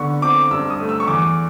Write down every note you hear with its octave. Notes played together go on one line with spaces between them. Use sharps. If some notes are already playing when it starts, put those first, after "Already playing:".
Already playing: D3 B3 C#6
C4 D6
G2 E6
D#6
A3
E6
C#6
E2 D6